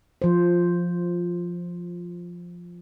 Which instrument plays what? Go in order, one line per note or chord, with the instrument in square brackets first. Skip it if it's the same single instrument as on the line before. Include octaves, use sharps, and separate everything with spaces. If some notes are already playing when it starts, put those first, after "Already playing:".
[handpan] F3 C5